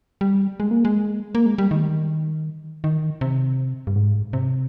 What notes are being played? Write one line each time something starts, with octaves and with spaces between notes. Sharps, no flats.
G3
G#3
A#3
G#3
A#3
G#3
G3
D#3
D#3
C3
G2
G#2
C3